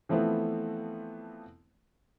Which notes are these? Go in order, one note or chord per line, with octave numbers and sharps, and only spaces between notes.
E3 F3 A3 B3 C4